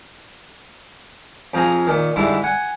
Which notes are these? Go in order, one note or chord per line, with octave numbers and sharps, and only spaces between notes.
F2 F3 G#4 G#5 A#5
A#2 D#3
G#2 D3 G3 E4 A5
F#5 G#5